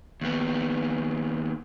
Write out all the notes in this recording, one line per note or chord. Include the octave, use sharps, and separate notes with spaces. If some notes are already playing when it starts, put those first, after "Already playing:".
D#2 B3